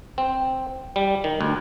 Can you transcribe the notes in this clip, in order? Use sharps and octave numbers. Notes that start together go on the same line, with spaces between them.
C4
G3
D#3
D2